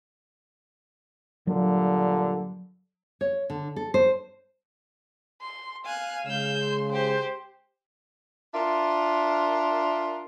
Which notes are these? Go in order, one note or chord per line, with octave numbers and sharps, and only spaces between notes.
G2 A#2 D3 F#3
C#5
D3
A4
C5
C6
F5 G#5 F#6
C#3 G#3 E6 G6
C6
G4 C5
D4 F4 A#4 E5